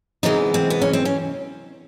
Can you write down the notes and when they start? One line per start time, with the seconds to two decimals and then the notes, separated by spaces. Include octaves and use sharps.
0.23 C3 E3 G#3 B3 D#4
0.54 C4
0.70 B3
0.82 C#4
0.93 C4
1.05 C#4